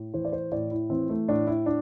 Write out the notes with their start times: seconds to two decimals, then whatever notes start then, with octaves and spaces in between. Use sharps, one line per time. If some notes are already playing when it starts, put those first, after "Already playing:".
Already playing: A2
0.14 E3 C5
0.25 D5
0.32 C5
0.52 A2 D5
0.71 E4
0.90 E3 C4
1.09 A3
1.28 A2 D4
1.47 E4
1.66 D4